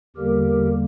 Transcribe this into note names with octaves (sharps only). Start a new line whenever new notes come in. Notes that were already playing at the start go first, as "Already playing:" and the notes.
E2 D3 G3 A#3 G4 A#4